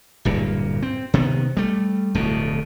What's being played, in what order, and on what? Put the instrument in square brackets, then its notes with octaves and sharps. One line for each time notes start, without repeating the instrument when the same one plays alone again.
[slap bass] D1 G2 A#2
C4
C3 D#3 B3
G3 A3
D1 F2 B2 A3